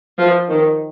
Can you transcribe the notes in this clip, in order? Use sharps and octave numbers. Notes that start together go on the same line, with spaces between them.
F3
D#3